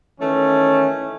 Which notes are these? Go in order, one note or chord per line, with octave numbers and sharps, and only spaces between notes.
D#3 E3 A3 C#4